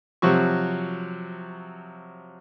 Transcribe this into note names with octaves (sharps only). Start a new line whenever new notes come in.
C3 F3 F#3 F#4 C#6